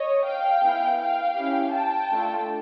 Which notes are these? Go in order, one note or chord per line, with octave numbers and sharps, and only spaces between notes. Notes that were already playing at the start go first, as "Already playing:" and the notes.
Already playing: C#5 D#5
F5 G5
B3 E4 G#4
F5 G5
C#4 E4 G4
G5 A5
A3 D4 F4 A4